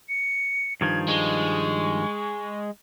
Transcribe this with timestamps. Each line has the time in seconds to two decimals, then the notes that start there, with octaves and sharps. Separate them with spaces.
0.09 C#7
0.81 G2 D#3 F3 G#6
1.08 G#3 C#6